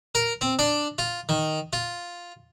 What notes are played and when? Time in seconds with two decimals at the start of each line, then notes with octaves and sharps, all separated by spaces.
0.15 A#4
0.41 C4
0.59 D4
0.98 F4
1.29 D#3
1.73 F4